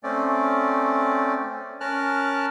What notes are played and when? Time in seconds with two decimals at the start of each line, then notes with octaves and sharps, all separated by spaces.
0.03 A3 C4 C#4 D5
1.81 C#4 A#4 A5 F6 F#6